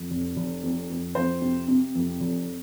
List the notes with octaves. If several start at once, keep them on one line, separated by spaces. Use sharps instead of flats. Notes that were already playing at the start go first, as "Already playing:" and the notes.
Already playing: F2
F1
F1
F2
F2
F2 C5
C3
C3
F2
F1